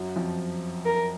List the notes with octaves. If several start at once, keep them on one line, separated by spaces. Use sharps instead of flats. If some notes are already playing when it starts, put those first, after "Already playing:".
Already playing: F#2 F#3
F2 F3
A#4